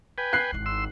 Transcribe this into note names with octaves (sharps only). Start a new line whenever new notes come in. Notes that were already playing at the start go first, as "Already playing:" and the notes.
B4 G5 G#5
F#6 C7
G#1 E4
C6 E6